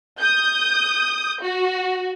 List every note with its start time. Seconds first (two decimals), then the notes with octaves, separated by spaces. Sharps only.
0.19 D#6 G6
1.43 F#4